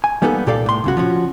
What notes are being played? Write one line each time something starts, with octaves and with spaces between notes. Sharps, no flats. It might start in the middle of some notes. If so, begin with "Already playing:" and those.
G#5
G3 A#3 B3 D#4 G4 A4
C2 A#2 G4 A4 D5 F5
A2 C6
C2 C#3 F#4
F3 C#4 F#4